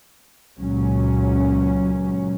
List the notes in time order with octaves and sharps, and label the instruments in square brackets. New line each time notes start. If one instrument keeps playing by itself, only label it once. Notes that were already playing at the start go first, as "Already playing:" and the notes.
[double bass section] C#2 A#2 F#3 C#4